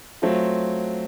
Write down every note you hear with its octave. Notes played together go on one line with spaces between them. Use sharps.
F#3 A3 C4 F4